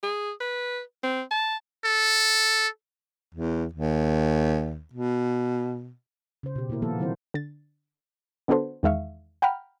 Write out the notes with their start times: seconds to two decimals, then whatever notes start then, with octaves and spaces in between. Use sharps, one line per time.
0.03 G#4
0.40 B4
1.04 C4
1.31 A5
1.85 A4
3.35 E2
3.73 D#2
4.93 B2
6.43 C#3 C5
6.56 B2 G4
6.69 A#2 A#3 E4 A#4
6.82 D#3 F3 A#3 B3 A4
6.99 D#3 E3 F#3 C4 E4 C5
7.34 D3 A6
8.48 D3 B3 D4 F#4 A4 C5
8.83 E2 D#3 G#3 E5 F5 C#6
9.42 F#5 G5 A#5 B5 F6